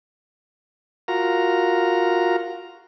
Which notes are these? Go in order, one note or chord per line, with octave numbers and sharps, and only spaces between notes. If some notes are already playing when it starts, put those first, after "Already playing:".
F4 F#4 A#4 A#5